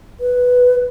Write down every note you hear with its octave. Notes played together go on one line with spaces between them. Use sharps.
B4